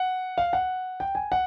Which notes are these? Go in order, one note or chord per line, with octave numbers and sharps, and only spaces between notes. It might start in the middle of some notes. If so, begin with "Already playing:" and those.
Already playing: F#5
F5
F#5
G5
G#5
F#5